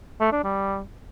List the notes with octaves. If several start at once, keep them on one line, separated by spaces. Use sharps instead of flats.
A3
D4
G3